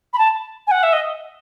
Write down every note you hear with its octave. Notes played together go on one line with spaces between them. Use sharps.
B5
A5
G#5
F#5
E5
D#5